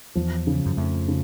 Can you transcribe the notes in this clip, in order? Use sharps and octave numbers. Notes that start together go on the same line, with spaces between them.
E2 F3
C#3
F#2
F2 A3
C#3